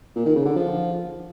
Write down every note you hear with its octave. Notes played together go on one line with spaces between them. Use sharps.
A#2
D#3
C#3
D3
F3